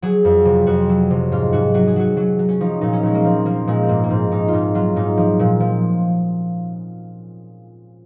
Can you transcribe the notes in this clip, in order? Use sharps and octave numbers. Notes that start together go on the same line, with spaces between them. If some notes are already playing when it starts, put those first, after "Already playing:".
F#3 G#4
F2
C3
F2 F#4
F#3
C3
G#2 F4
G#2 F#4
F#3 F#4
G#4
F#3 F#4
F#3
F#3
C#4
F3 D#4
A#2 D#4
C#4
A#2 G#3
A#3
F3 C4
F3 A#3
A#2 G#3
C4
G#2 A#3
A#3
G#2 C4
G#2 D#4
F4
G#2 D#4
F#3 F4
G#2 D#4
F3
A#2
F3